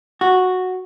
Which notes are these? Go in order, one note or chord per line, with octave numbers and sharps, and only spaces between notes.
F#4